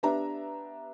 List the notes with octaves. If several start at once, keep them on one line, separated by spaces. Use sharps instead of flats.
B3 D4 G4 E5 A#5